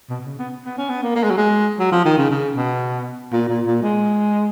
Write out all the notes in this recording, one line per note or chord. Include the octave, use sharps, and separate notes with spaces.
B2
B2
C#3
B3
B3
C#4
B3
A#3
A#3
G#3
F#3
G#3
F#3
F3
D#3
C#3
C#3
B2
A#2
A#2
A#2
G#3